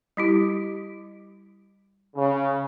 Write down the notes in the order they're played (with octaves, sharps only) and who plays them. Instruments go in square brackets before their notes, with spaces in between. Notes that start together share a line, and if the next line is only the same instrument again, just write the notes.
[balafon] G3 E4 G4
[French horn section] C#3